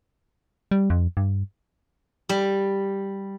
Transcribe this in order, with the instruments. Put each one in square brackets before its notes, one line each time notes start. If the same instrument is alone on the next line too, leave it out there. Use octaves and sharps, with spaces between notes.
[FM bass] G3
F2
G2
[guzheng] G3